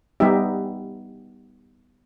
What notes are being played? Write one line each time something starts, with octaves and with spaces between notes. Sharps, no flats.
G3 B3 D#4 G4 E5